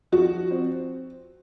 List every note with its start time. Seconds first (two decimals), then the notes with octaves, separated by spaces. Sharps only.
0.12 F3 F#4
0.51 C4